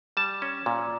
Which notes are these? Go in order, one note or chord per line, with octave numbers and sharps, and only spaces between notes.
G3 A5
C#4
A#2